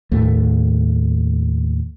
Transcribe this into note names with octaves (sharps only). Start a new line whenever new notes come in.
D#2 A2 A3